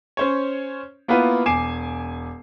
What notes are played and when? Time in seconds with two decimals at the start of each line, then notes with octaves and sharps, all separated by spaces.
0.17 C#4 C5 C#5
1.08 A#3 B3 E4 F4 B4
1.46 E1 G#5 D6 C7 E7